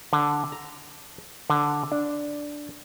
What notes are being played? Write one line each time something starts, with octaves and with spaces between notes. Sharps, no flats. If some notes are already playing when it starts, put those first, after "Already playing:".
D3
A#5
D3
D4